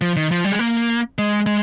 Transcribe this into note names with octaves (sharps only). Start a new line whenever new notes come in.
F3
D#3
F3
G3
G#3
A#3
G#3
G#3